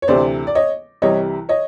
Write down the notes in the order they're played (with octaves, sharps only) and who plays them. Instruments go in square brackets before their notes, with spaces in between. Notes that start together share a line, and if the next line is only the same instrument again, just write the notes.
[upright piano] C#5
D2 C3 E3 C5 D5
D5
C#5 D#5
C2 C3 E3 G3 C#5 D#5
C#5 D#5